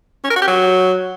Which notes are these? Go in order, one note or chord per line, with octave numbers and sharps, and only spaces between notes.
C#4
A#4
F#4
G4
F#3